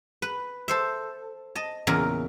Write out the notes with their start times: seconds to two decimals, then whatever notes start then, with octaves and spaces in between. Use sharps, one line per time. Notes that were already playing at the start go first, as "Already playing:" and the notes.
0.22 B4
0.68 A4 C5 E5
1.55 D#5 A5
1.87 E2 A#2 C#3 A#4